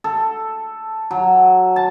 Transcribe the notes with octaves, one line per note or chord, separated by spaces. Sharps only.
A4
F#3
A5